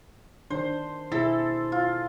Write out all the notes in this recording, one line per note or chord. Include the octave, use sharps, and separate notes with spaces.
D#3 D4 C5
B2 E4 G#4 A4
F4